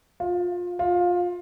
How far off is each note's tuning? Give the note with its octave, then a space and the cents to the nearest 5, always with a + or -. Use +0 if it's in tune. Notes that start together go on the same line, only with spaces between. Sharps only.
F4 +25
F4 +20